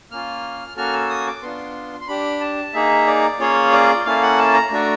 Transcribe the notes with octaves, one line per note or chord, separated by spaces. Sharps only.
A#3 C#4 F4 F6
A#3 C#4 F#4 A4 F6
E6
D#6
D6
B3 D4 F4 C6
C6
D4 G4 B5
A5
A#3 D#4 G#4 E5
D5
A#3 C#4 F4 G#4 C#5
D5
A#3 C#4 E4 A4 F5
F#5
A5
A#5
A3 D4 F#4 A4